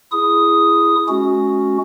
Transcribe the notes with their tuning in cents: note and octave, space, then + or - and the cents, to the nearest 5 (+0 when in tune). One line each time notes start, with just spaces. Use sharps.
E4 +20 G#4 +0 D#6 +0
G#3 +35 C#4 +0 F#4 +0